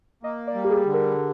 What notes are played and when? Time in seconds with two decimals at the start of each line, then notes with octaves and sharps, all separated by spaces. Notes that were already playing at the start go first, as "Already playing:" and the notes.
0.23 A#3 D#5
0.47 D5
0.54 G3
0.64 G4
0.70 G#4
0.85 D3
0.94 A#4